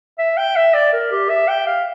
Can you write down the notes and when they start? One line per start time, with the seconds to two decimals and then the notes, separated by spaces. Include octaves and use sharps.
0.19 E5
0.37 G5
0.56 E5
0.74 D5
0.93 A#4
1.11 G4
1.29 E5
1.48 G5
1.67 F5